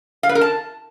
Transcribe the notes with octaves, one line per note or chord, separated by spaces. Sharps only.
F5
B4
A#4
A5